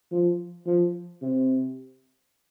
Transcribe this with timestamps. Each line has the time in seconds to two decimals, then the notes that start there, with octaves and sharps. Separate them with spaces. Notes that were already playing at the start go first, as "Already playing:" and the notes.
0.11 F3
0.66 F3
1.22 C3